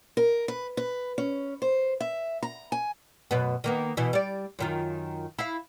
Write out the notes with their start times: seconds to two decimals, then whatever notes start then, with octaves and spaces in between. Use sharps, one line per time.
0.17 A#4
0.48 B4
0.77 B4
1.18 C#4
1.62 C5
2.00 E5
2.43 A#5
2.72 G#5
3.31 F#2 B2 B3
3.64 D#3 A#3 B3
3.97 B2 E3
4.13 G3 D5
4.59 F#2 D#3 F4
5.39 E4 F5